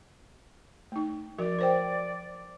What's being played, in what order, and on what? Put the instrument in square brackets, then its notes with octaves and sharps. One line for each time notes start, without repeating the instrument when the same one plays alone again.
[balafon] A3 D#4
[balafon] F3 F#4 A#4 [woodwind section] D5
[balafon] A#4 C5 G5